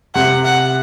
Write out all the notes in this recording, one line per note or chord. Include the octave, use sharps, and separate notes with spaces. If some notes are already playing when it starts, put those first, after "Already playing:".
C3 F#5
F#5